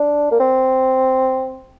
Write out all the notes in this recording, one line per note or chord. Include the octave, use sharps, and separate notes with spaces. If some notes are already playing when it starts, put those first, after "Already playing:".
Already playing: D4
A#3
C4